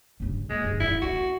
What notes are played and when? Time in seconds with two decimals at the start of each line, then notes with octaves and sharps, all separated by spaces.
0.20 G2 C#3
0.50 G#3 A#3
0.64 G1 D3
0.80 E2 G2 E4
1.02 D#2 F#4